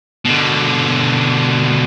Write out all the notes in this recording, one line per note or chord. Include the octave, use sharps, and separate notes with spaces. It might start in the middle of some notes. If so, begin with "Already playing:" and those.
B2 D3